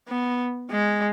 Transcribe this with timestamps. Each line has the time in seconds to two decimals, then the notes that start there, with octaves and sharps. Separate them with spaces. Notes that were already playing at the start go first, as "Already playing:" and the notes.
0.08 B3
0.71 G#3